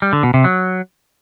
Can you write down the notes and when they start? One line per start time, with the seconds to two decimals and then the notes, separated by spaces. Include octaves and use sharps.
0.02 G3
0.13 D3
0.23 B2
0.34 C3
0.44 F#3